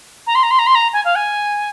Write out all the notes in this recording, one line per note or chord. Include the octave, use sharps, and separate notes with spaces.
A#5
C6
A#5
C6
A#5
C6
A#5
G#5
F5
G#5